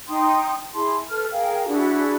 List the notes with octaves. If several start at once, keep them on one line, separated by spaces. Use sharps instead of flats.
D#4 G5 C6 D#6
E4 G#4 A5 C6
A4 B4 F6
G#4 A#4 F5 G5
D4 E4 F#4 G#4